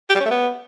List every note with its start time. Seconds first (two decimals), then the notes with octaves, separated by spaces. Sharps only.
0.10 G4
0.15 G3
0.20 C#4
0.26 A3
0.31 B3